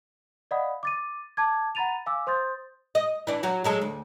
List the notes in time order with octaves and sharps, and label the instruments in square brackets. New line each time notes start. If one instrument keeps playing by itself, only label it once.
[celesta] D5 D#5 F5 F#5 B5 D#6
D6 A6 D#7
A5 D6 G#6
F#5 A#5 B5 A6 D#7 F7
F5 G#5 D6 E6
C5 C6 D#6 G6 A6
[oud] D#5
E3 D4
F#3 F#4
F#3 G#3 A4
D2